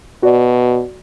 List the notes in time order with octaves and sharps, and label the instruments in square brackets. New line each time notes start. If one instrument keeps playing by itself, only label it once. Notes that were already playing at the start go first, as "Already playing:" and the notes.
[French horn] B2 [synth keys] F#4 D5